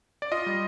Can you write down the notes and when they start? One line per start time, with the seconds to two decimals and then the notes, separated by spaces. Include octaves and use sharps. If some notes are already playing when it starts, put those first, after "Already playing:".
0.22 D5
0.32 F4 D#5
0.46 G3